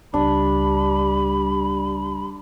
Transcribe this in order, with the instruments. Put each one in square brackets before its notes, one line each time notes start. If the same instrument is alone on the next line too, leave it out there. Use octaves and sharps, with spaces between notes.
[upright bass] C#2 [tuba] G3 [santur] D4 [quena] B5